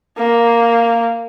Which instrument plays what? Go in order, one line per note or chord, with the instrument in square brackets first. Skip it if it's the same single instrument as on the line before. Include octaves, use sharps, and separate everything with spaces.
[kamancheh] A#3